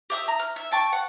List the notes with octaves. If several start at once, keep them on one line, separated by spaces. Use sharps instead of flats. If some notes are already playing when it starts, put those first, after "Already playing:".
G4 E5 D#6
A#5
F6
E5
G5 A5 C#6
F#5